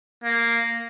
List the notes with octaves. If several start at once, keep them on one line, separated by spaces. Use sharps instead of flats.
A#3